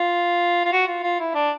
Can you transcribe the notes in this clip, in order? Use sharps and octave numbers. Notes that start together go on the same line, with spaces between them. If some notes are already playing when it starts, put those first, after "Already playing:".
Already playing: F4
F4
F#4
F4
F4
E4
D4